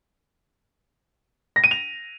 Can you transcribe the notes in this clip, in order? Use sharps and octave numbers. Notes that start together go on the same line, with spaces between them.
A#6
D#7
F7